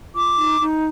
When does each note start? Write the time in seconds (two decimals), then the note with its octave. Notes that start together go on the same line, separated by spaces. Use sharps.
0.14 F4 D6
0.37 D#4
0.60 D#4